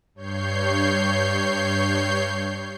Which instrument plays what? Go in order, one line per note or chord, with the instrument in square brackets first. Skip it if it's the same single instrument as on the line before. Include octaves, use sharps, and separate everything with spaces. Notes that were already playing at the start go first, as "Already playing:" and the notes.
[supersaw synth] G2 C#5 G6 C7